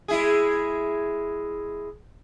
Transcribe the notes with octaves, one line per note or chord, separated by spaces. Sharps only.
G#3 E4 G#4